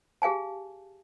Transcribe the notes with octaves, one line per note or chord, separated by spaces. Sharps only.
G4 G#4 F5 G#5 A5